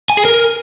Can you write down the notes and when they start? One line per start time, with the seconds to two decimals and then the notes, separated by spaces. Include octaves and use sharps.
0.10 G#5
0.17 G#4
0.25 A#4